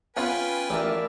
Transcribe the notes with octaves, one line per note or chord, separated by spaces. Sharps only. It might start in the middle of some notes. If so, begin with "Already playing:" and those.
B3 C#4 F4 B4 G5 G#5
A1 A#4 D5 E5